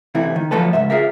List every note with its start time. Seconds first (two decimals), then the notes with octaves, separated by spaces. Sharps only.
0.15 C3 E3 A3 E4
0.36 D#3
0.51 F3 F#3 A3 A4 B4
0.73 C#2 G#2 E5
0.90 F4 G#4 A#4 E5